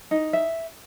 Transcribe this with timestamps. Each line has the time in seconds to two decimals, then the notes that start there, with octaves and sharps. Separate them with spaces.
0.11 D#4
0.33 E5